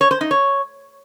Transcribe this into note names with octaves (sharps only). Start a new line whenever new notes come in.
C#5
C5
D#4
C#5